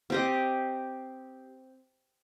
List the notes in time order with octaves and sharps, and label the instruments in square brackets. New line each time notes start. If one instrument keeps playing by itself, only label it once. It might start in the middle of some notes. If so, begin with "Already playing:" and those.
[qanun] C4 G4 D#5